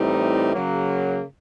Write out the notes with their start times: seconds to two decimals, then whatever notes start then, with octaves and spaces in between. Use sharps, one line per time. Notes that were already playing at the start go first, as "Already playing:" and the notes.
Already playing: A2 E3 G3 C4 D#4
0.54 C#3 F#3 A#3